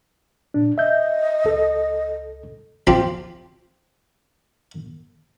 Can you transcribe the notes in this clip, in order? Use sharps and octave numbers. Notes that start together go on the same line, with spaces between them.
A#2 D4
D#5 E5 G6
C#2 A4
F3 C4 F4 G4